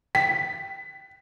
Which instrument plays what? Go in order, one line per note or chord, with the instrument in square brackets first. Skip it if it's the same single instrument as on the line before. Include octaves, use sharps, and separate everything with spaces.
[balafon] G5 [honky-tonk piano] B6